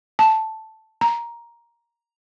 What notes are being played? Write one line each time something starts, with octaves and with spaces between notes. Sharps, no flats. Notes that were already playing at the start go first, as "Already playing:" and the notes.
A5
A#5